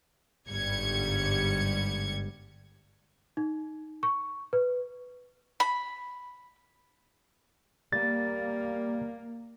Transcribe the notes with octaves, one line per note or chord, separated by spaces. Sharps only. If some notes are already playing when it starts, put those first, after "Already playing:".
G1 G#2 G3 G#6 C#7
D#4
C#6
B4
B5
G3 A#3 A6